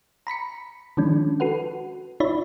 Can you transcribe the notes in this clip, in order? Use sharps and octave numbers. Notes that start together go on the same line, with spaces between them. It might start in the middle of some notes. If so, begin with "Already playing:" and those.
A#5 B5 B6 C#7
D#3 F3 G#3 C#4 D4
F#4 A4 B4 F#5
D#4 F4 C#5 D5 E5 B5